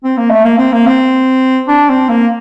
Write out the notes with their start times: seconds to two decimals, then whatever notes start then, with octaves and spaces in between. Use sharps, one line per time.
0.04 C4
0.18 A#3
0.31 A3
0.44 A#3
0.58 C4
0.73 A#3
0.87 C4
1.68 D4
1.89 C4
2.09 A#3